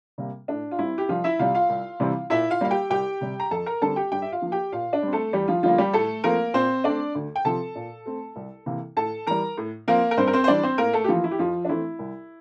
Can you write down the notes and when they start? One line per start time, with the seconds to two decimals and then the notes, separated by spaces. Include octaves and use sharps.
0.18 C3 G3 A#3
0.48 A2 D4
0.71 F4
0.79 G3 C4 E4
0.98 G4
1.09 C2 F3 F4
1.24 E4 E5
1.39 C3 G3 F4 F5
1.55 F4 F5
1.69 C2
2.00 C3 E3 G3 C4
2.30 A#2 E4 E5
2.50 F4 F5
2.61 G3 A#3 F5
2.71 G4 G5
2.90 C2 G4 G5
3.21 C3 G3
3.40 A#5
3.51 F2 A4 A5
3.66 A#4 A#5
3.82 D3 G3 C4 A4 A5
3.96 G4 G5
4.12 G2 G4 G5
4.22 E5
4.32 F4 F5
4.42 F3 A#3
4.52 G4 G5
4.72 A#2 F4 F5
4.93 D4 D5
5.03 G3 C4
5.13 A3 A4
5.33 E2 G3 G4
5.48 F3 F4
5.63 D3 F3 G3 A#3 F4
5.78 G3 G4
5.93 A2 A3 A4
6.24 F3 A3 A#3 C4 A#4
6.54 A#2 C4 C5
6.84 A3 C4 D4 D5
7.15 D2
7.36 G5
7.45 C3 F3 C4 A4 A5
7.75 A#2
8.06 A3 C4
8.36 C2
8.66 C3 E3 A#3
8.97 A2 A4 A5
9.27 E3 G3 A#4 A#5
9.57 A2
9.88 F3 A#3 C4 A#4
10.11 A#4
10.17 G2 C4 C5
10.27 A#4
10.33 C4 C5
10.44 C5
10.48 E3 G3 C4 D4 D5
10.63 C4 C5
10.78 A2 A#3 A#4
10.93 A3 A4
11.04 G4
11.09 E3 F3 A#3 F4
11.24 E4
11.31 G4
11.39 F2 F3 F4
11.65 D4
11.69 E3 A3 C4 E4
11.99 C2